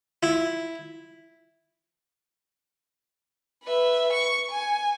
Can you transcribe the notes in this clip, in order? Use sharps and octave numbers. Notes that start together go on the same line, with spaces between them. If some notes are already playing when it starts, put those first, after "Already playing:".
E4
B4 E5
C#6
G#5